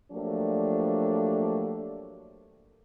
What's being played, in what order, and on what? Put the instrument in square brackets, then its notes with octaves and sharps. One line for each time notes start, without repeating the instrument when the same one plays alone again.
[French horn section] F3 F#3 A3 A#3 D4 G4